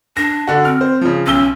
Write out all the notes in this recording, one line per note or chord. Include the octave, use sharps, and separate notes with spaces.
D4 A#6
D3 F#4
C4 F6
C5
C#3 F3
B1 C#4 E6 G7